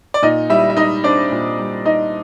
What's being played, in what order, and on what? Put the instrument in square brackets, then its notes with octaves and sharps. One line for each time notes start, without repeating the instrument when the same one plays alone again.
[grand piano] D5
A#2 D#4 D#5
G3 E4 E5
E5
D#4 D#5
C4 D4 D5
A#2
G3
D#4 D#5